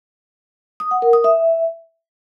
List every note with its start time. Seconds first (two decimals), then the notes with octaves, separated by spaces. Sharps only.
0.80 D#6
0.91 F#5
1.02 A#4
1.13 D#6
1.24 E5